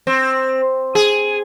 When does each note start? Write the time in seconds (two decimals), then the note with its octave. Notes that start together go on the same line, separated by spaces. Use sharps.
0.07 C4
0.95 G#4